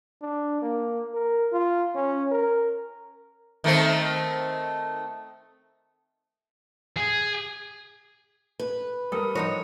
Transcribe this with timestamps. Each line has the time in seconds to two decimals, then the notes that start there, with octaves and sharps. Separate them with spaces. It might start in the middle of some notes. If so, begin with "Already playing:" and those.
0.21 D4
0.62 A#3
1.14 A#4
1.52 F4
1.95 C#4
2.32 A#4
3.64 D#3 A3 C4
6.96 G#4
8.60 B4
9.12 G3 A4 A#4 D#6
9.35 F3 D#4 F#4 C#5